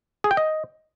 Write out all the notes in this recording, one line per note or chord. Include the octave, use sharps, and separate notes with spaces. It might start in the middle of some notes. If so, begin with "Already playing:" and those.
G#4
G5
D#5